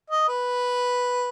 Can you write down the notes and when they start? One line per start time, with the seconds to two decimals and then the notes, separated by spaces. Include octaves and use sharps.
0.10 D#5
0.28 B4